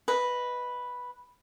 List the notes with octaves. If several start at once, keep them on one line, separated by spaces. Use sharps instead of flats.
B4 D#5